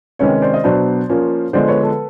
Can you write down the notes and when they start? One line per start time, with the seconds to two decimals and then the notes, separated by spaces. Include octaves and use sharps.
0.19 C3 D#3 G#3 C#4 B4 C#5
0.42 C5 D5
0.54 D#5
0.64 B2 F#3 B3 D4 C5 D5
1.09 F3 A#3 C#4
1.53 D3 F3 G#3 B3 C5 D5
1.68 B4 C#5
1.83 A4 B4